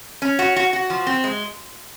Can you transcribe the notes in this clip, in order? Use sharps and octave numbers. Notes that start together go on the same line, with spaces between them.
C#4
F#4
F#4
F#4
F3
C4
G#3